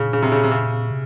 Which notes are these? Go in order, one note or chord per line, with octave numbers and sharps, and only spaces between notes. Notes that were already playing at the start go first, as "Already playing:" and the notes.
Already playing: A#2 C#3
C#3
C3
C#3
C3
C#3
C3